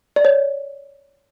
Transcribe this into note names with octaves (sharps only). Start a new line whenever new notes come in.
D5
C#5